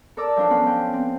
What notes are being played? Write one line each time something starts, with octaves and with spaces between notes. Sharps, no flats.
A4 A#4 D5 D6 E6
F3 F#3 D4 F4
F3 B3 C#4 B4 F5 B5
G5
C4